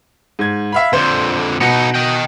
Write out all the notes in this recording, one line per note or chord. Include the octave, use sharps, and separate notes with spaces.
G#2 G#6
E5 F5 B5
F2 D3 C5
B2 B3 D#4 F#4 C#7
D#5 G5